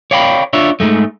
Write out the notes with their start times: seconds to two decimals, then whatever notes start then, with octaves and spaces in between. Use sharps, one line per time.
0.11 C#5 D5 F5 G5 A5 B5
0.53 D4 F4 C#5 E5
0.80 G#2 D3 G#3 A3